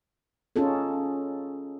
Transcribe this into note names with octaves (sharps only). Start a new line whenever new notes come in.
C#4 D#4 F4 G#4 A4